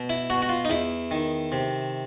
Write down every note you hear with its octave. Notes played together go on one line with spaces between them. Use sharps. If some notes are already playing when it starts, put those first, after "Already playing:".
Already playing: B2
E4
B2 F#4
F#4
F4
D#4
E2 E4
D#3
C3